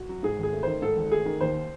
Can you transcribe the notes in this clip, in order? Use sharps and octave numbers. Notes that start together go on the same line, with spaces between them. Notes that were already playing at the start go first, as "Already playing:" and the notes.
Already playing: F#4
F#3
G#2 G#4
G#1 G#4
A3
D#3 C5
G#2 A4
G#1
A3 G#4
D#3
D#2 C5